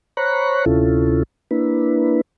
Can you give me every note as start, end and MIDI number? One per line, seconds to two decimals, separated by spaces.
0.17 0.65 72
0.17 0.65 73
0.17 0.65 82
0.17 0.65 83
0.17 0.65 85
0.17 0.65 90
0.66 1.23 38
0.66 1.23 48
0.66 1.23 61
0.66 1.23 64
0.66 1.23 65
0.66 1.23 69
1.51 2.21 58
1.51 2.21 62
1.51 2.21 64
1.51 2.21 71